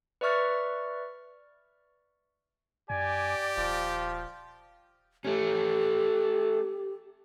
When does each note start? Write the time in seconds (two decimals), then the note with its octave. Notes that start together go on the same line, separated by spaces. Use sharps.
0.21 B4 D5 E5 C#6 F6 A6
2.90 F#2 G4 D5 G#5
3.58 D#1 F3
5.25 A3 C#4 G4